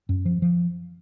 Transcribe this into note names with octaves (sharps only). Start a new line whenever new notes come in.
F#2
F3
F3